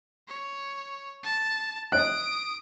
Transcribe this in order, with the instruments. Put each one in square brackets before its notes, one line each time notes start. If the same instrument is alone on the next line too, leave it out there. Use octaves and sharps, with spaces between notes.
[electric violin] C#5
A5
[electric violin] D#6 D7 [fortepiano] F#6